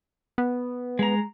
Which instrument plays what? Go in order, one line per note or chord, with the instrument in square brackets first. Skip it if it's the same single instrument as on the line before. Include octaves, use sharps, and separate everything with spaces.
[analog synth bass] B3
[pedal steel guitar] G#3 A#5